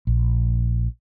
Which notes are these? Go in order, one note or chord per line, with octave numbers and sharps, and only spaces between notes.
A#1